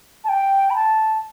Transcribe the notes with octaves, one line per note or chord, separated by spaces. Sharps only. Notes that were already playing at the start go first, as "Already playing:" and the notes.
A5
G5
B5
A5